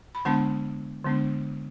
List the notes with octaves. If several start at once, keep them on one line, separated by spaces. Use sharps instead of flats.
B5
D3 G#3 B3 D4 F#5 A5
D3 G#3 B3 D4